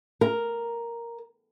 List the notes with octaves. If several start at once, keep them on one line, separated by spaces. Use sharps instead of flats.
A#4